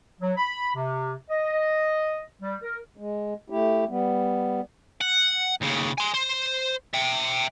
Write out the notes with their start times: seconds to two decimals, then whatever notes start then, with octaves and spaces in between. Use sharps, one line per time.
0.21 F#3
0.37 B5
0.76 C3
1.30 D#5
2.42 G3
2.62 A#4
2.97 G#3
3.50 A3 E4 G4
3.88 G3 B3
5.01 F#5
5.62 D#2 C#3
5.98 G#5 C6
6.14 C5
6.94 E5 G5